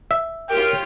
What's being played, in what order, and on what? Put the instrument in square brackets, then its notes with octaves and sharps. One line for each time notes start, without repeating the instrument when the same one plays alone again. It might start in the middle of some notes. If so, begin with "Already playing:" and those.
[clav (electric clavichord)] E5
[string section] F4 G4 C#5 [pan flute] A#4 [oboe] G5